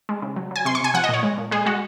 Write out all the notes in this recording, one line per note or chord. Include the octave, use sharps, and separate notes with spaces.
G#3
C#3
F#3
F#3 G#5
C3 C6
C#6
C3 G#5
F3 F#5
D#5
A#2 C#5
G#3
A#2
G#3 G#4
G#3 F#4